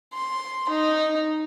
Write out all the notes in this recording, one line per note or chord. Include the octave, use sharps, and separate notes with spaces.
C6
D#4